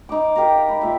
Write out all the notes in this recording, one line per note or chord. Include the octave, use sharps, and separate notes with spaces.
D#4 D6
G4 A#4 F5 A#5
B5 D6
A#2 E5